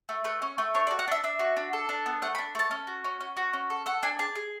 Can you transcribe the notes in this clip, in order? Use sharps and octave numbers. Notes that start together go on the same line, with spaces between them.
A3
A3 B4
C#4
A3
D4 C#5
D5
F#4
F#5
D4 E5
D4 E5
F#4
D4
A4
D4
B3
A3 F#5
B5
D4
A3 A5
C#4
F#4
C#4
C#4
F#4
C#4
A4
A4 F#5
D4 G#5
G#4 A5
G#4